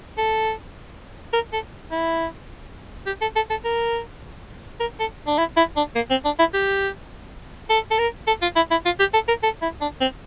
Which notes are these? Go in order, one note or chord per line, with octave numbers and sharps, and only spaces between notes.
A4
A#4
A4
E4
G4
A4
A4
A4
A#4
A#4
A4
D4
E4
E4
D4
A#3
C4
D4
E4
G4
A4
A4
A#4
A4
F4
E4
E4
F4
G4
A4
A#4
A4
E4
D4
C4